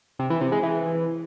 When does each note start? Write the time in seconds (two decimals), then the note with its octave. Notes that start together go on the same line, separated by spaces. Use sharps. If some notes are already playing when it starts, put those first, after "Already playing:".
0.19 C3
0.30 E3
0.41 C3
0.52 G#3
0.63 E3